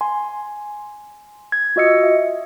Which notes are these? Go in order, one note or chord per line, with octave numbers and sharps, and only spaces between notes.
G#5 C6
G#6
F4 F#4 D#5 E6 C#7
E5